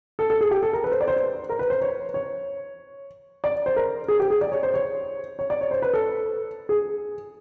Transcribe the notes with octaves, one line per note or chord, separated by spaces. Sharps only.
A4
A4
G#4
G4
A4
A#4
B4
C5
D5
C5
B4
A#4
B4
C5
C#5
C#5
D5
C5
A#4
G#4
G4
G#4
D5
C#5
C5
C#5
C#5
D5
C#5
C5
B4
A4
G#4